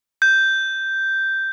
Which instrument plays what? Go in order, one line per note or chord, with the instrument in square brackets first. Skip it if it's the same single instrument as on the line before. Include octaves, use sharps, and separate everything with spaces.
[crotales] G6